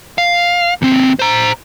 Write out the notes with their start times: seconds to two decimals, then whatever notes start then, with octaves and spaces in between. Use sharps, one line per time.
0.18 F5
0.82 D#2 C4
1.19 C5 A#5